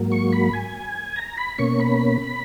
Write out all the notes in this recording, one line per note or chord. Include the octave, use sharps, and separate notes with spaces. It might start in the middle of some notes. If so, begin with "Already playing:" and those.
Already playing: G#2 F#3 A#3
C#6
B5
G#5
A#5
B5
B2 A#3 C#4 C#6
B5